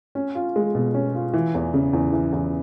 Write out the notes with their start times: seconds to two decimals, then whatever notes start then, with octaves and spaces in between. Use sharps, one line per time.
0.15 C#4
0.35 F4
0.56 G#3
0.75 B2
0.94 C#4
1.15 F4
1.34 E3
1.54 E2
1.74 C#3
1.93 E2
2.12 E3
2.32 E2